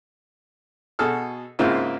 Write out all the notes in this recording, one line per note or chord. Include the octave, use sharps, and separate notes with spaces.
B2 F#4 G#4 A4 F6
G#2 C#3 A#3 C4 E4 F4